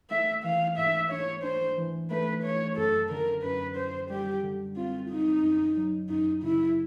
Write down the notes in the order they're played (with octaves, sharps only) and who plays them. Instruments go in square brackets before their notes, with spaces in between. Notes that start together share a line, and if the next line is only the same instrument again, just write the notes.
[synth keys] A3 [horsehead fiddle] E5
[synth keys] E3 [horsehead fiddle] F5
[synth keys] G#2 [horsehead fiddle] E5
[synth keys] D4 [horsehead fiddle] C#5
[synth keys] D4 [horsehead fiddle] C5
[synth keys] E3
[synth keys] A3 [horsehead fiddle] B4
[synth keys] A3 [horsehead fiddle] C#5
[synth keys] F#2 [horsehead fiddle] A4
[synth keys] D3 [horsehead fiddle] A#4
[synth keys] F#2 [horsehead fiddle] B4
[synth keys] F#2 [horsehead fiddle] C5
[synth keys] G3 [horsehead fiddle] G4
[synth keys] D3
[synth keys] C4 [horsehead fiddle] F4
[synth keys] D3 [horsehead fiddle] D#4
[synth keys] F#2
F#3
[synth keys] F#2 [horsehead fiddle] D#4
[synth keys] C#3 [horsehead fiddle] E4